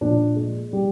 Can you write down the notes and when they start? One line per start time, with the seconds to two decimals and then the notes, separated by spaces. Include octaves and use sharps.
0.01 A#2 F3 D4
0.36 G#3
0.73 G3